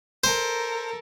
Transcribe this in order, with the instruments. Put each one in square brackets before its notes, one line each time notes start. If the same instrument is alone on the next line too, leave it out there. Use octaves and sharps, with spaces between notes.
[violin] A4 A#4 [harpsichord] C5